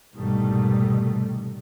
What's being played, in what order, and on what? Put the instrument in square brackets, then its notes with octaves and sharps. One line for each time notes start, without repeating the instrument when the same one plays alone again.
[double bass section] C2 G#2 B2 D#3 G3 A3